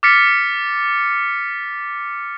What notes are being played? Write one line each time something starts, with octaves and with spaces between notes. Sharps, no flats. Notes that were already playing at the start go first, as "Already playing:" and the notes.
D6 F6 A6 B6 C#7